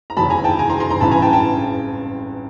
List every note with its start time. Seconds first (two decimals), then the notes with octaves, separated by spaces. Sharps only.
0.10 A#5
0.17 F1 D#2 D#3 F#3 A5 B5
0.30 G#5 A#5
0.44 G5 A5
0.59 G#5 A#5
0.69 A#5 C6
0.80 A#5 C6
0.90 A#5 C6
1.00 A1 G2 E3 A5 B5
1.11 G#5 A#5
1.22 G5 A5
1.33 G5 A5